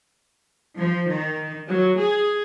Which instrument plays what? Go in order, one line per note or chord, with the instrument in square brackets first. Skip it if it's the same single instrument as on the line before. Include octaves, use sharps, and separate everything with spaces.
[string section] F3
D#3
F#3
G#4